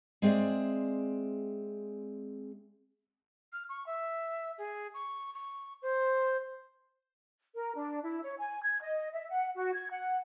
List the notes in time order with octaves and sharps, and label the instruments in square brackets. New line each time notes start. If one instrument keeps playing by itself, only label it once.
[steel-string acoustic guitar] G#3 C4 G#4 D5 E5
[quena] F6
C#6
E5
G#4
C#6
C#6
C5
[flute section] A#4
D4
E4
C#5
G#5
G#6
D#5
E5
F#5
F#4
G#6
F#5